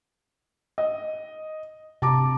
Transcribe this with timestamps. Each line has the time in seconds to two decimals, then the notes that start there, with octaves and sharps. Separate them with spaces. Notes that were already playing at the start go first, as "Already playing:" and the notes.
0.78 D#5
2.02 C3 A5 A#5 D6